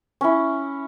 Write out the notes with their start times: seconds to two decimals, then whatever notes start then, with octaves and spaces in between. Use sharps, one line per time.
0.21 C#4 E4